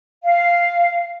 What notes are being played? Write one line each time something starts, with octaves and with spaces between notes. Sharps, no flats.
F5